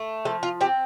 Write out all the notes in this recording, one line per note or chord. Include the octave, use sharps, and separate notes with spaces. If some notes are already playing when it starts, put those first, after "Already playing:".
Already playing: A3
F3 A4
F4
C4 G4